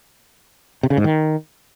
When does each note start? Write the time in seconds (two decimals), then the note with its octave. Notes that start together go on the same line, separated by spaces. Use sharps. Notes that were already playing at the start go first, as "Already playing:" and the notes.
0.83 C3
0.90 C#3
0.97 G#2
1.04 D#3